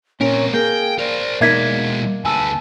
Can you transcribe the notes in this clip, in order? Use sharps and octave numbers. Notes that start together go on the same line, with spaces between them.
A#2 C4 C#4 A#4 C#5
A#3 G#4 G5
A#4 C5 D5
B2 G#3 A#3 D#4 E5 G#6 B6
D2 B4 G#5 A5 E6